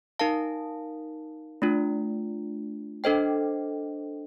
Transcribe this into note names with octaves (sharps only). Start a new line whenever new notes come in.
D#4 A#4 F5 A5
A3 D4 F4
D4 A4 C5 D#5 G5